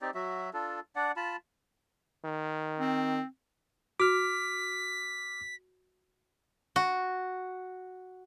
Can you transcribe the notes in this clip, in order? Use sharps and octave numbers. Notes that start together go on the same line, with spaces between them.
C4 D#4 G4 D5
F#3 F#4 E5
D4 F4 A4
D4 D5 F#5
F4 A5 B5
D#3
C4
F#4 D6 F6 B6
F#4